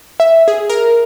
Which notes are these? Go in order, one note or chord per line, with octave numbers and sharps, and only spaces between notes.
E5
G#4
A#4